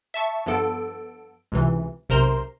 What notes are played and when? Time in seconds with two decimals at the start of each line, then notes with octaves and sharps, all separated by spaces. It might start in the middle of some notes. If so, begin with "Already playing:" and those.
0.14 E5 A5 C#6
0.46 G2 F3 B3 A4 D7
1.52 C#2 C3 E3
2.09 B1 C3 A#4 C5 A#5 C6